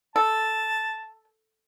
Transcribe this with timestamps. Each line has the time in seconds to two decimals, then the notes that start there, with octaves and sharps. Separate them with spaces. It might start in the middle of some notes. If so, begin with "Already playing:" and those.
0.16 A4 A5